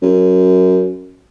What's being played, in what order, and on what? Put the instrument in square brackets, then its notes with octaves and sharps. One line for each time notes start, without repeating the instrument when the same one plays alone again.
[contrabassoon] F#2